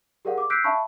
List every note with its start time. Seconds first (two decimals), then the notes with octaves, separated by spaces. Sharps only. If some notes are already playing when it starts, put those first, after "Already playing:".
0.25 G4 G#4 A#4 D5 F5 F#5
0.38 D6
0.50 E6 F#6 G6 B6 C7 D7
0.64 E5 F5 A5 B5 C#6